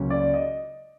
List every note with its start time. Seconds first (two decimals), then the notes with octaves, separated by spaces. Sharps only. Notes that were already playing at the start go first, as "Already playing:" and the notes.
Already playing: C#2 C#3 F#3 A#3 C#4
0.10 D5
0.34 D#5